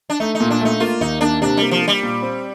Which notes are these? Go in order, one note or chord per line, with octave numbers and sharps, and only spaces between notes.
D4
A3 D#4
D#4
A#2
D4
A3 D#4
A#3 F4
D#2 D#4
A#3 D4
C3 D4
G3 A#3
F3
A#3
G3
A#2
C4